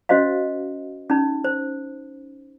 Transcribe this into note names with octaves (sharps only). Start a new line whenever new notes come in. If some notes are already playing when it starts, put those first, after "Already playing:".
C#4 F#4 C5 D#5 F5
C#4 D#4
C5